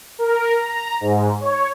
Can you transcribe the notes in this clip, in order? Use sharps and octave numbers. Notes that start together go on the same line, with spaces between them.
A#4
A#5
G#2
C#5